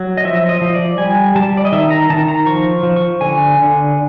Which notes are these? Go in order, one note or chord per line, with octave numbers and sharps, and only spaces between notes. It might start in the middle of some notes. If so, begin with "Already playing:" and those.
Already playing: F#3
D#5
F3 E5
D#5
F3
D5
G3 G#5
G3 A5
D5
D#5
D#3 E5
A#5
D#3 A5
A#5
F3 C#6
F3
C#6
D3 G#5
D3